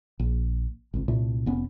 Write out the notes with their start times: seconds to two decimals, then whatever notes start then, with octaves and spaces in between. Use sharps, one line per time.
0.19 A#1
0.94 G#1 C#2
1.08 C2 A#2 A3
1.46 F1 B3 C#4